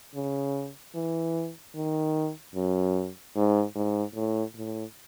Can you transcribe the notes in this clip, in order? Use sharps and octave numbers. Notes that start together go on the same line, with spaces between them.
C#3
E3
D#3
F#2
G#2
G#2
A2
A2